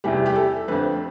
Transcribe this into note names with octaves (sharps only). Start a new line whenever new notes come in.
E2 C3 E3 G3 G4
G4
A4
F2 D3 A3 C4 B4